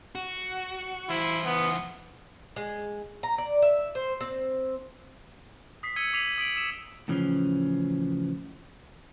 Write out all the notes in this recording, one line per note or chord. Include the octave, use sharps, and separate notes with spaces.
F#4
E3 E4 C5
B3
G#3
A#5
D5
E5
C5
C4
D#6 B6 C7
E6 G#6 C#7 D#7 G7
D6 B6 C7 D#7 F7 F#7
D#6 B6 D7 F#7
D#6 E6 B6 E7
A2 C#3 E3 F3 C#4